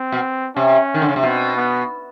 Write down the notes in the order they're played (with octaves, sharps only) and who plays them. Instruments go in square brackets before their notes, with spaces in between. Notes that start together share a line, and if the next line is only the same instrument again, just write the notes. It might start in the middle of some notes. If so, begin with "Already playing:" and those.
Already playing: [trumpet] C4
[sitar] B2
[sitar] C3 [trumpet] C#4
[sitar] D#3
D3
C#3
C3
[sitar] B2 [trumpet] C4
[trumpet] B3